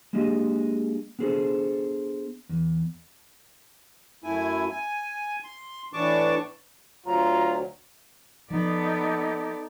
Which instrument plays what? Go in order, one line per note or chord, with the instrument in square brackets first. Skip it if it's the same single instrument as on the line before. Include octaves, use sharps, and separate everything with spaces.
[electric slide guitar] G#3 A#3 D4 G4 G#4 D#5
B3 D4 G#4 A4 C5
E2
[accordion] F#2 A3 E4 G#5
G#5
C6
A2 E3 D4 A5 C#6 D6
[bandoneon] D2 F#3 [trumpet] F4 [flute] A#5
[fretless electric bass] F3 [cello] B3 D5 [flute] D#4 [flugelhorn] A4